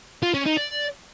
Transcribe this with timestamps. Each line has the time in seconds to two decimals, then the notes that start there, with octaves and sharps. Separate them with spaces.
0.23 F4
0.34 C#4
0.46 D#4
0.57 D5